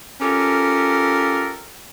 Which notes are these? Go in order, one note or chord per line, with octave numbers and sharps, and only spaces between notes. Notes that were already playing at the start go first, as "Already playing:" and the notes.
C#4 F4 G4 A4 A#4